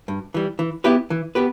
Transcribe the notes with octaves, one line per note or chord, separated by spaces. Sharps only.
G2
E3 G3
E3
B3 E4 G4 B4
E3
B3 G4 B4